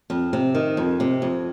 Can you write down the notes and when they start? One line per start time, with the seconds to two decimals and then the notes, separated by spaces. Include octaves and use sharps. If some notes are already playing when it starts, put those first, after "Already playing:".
0.10 F2
0.33 C3
0.54 D#3
0.77 F2
1.00 C3
1.22 F2